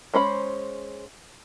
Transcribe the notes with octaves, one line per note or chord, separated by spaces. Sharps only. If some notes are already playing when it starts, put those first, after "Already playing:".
G#3 C#4 C5 B5